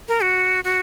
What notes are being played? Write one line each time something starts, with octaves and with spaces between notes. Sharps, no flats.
A#4
F#4
F#4